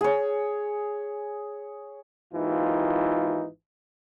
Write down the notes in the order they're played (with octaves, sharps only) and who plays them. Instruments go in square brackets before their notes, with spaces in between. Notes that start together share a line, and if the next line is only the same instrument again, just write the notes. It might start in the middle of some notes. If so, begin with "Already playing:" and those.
[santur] G#4 C#5
[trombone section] G#1 D#2 E3 D#4 F4